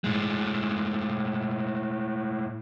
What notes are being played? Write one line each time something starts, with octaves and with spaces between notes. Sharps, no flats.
A2 G#3